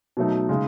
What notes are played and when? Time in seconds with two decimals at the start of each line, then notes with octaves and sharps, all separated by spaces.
0.17 B2 F#3 A3 D#4
0.49 C#3 G#3 D#4